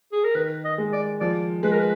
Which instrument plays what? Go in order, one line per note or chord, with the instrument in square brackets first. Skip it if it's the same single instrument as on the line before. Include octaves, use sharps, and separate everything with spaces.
[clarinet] G#4
A#4
[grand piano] D#3 [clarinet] B4
[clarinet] D#5
[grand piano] G#3
[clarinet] D5
[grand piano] F3 [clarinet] D5
[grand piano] G#3 [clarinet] B4
[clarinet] A#4
B4